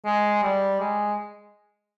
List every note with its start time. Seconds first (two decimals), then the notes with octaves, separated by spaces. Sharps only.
0.05 G#3
0.43 G3
0.80 G#3